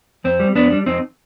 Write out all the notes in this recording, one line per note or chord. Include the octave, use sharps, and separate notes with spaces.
F2 C4
G3
F2 B3 D4
G3
F2 C4 D#4